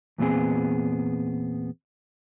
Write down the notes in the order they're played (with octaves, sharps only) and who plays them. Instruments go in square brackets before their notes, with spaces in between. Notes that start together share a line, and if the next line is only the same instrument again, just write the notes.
[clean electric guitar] E2 A#2 B3 C4 G#4